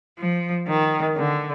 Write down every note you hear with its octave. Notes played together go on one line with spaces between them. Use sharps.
F3
D#3
D3